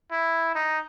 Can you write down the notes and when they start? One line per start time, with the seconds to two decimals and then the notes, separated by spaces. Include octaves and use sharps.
0.12 E4
0.55 D#4